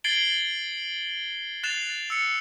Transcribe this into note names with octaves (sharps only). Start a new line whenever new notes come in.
G#6 A6 C7 D7 F#7 G7
F#6 A6 C7 E7 F7
E6 C#7